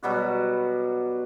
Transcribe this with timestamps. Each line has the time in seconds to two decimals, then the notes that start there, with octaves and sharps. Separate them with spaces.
0.03 B2 F#3 G3 F#4